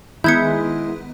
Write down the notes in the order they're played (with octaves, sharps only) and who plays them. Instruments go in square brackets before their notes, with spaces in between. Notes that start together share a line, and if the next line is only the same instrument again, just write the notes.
[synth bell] D#3 B3 [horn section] G#3 [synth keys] E4 [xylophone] G6 G#6 C#7